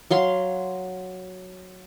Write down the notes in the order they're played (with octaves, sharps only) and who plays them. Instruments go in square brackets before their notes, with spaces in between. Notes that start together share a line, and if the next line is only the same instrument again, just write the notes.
[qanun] F#3 F5 C6